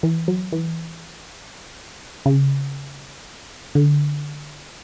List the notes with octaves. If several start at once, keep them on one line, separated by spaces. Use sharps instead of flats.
E3
F#3
E3
C#3
D3